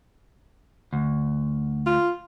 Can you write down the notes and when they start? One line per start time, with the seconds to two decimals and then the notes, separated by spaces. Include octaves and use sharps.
0.93 D2
1.87 F4